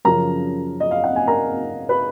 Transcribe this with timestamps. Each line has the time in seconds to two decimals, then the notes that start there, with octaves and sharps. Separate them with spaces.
0.05 F#2 C#3 F3 A#4 A#5
0.80 D#5
0.91 F5
1.04 F#5
1.16 G#5
1.28 A#4 A#5
1.89 B4 B5